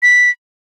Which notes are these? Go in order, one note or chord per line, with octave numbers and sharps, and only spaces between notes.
B6